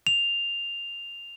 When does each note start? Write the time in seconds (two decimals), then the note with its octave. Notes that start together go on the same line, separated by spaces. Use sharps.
0.07 F7